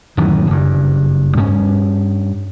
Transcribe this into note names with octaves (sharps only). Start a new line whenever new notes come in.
D1 F#2 D#3 E3
F#1 G2
G2 C#4